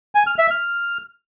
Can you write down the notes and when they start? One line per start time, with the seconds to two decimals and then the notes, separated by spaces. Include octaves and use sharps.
0.15 G#5
0.27 F6
0.39 E5
0.50 F6